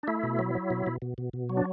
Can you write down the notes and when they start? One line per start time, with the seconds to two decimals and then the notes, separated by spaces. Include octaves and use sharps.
0.03 D4
0.08 A3 E4
0.23 B2
0.39 F#3
0.55 F#3
0.70 B2
0.87 B2
1.02 B2
1.18 B2
1.33 B2
1.50 F#3
1.57 D4